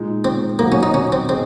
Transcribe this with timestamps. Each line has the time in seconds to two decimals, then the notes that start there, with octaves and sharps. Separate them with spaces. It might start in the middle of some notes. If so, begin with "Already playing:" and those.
Already playing: A#2 G#3 D#4
0.25 C4
0.59 D#3 F#3 A#3 C4 F#4
0.72 C#4
0.83 D#4
0.94 C#4
1.12 C4
1.29 C4 D#4 G#4 D#5